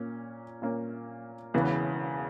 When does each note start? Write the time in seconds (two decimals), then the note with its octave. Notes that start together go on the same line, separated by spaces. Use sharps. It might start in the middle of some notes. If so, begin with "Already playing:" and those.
Already playing: A#2 A#3 C#4
0.62 A#2 A#3 C#4
1.54 E1 E2 C#3 E3 B3